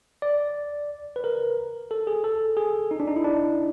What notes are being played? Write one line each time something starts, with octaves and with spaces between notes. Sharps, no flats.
D5
B4
A#4
A4
G#4
A4
G#4
D#4
D4
D#4
E4
D4